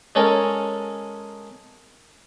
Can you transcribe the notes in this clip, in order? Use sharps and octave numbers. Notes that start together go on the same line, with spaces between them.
G#3 C#4 A4 A#4